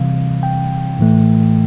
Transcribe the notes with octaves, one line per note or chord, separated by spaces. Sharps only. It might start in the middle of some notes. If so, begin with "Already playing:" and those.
Already playing: C3 E3 G3 C4 F5
G5
A2 E3 A3